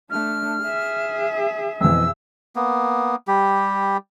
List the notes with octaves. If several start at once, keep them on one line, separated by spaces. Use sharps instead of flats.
A3 D4 F6
G#4 E5
F2 B2 E3 E6
A#3 B3
G3 G4